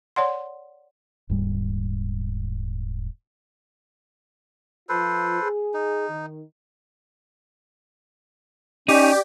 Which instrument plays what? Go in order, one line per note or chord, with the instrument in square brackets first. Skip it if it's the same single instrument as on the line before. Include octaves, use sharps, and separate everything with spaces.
[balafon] C#5 D5 F#5 C6
[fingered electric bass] D#1 G#2 G3
[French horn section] F3 F4 [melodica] A4 B4 C5
[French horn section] G#4
[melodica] D#4
[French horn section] D#3
[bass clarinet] C#4 [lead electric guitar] D#4 [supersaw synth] G4 [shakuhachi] D5